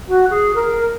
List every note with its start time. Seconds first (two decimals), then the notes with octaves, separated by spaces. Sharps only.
0.08 F#4
0.30 G#4
0.55 A#4